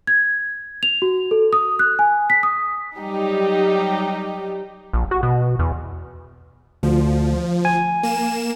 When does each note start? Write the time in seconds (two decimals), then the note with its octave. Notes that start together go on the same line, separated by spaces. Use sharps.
0.07 G#6
0.83 F7
1.02 F#4
1.31 A4
1.53 D#6
1.79 F#6
1.99 G#5
2.30 B6
2.43 D#6
2.97 F#3 G3 D#4 G4
4.93 A#1
5.11 F#4
5.23 B2
5.59 E2
6.83 D2 F3
7.65 G#5
8.03 A#3 E7